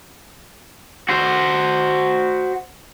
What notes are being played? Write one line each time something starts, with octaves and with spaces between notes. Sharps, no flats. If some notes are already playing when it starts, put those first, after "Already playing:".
F#4 C5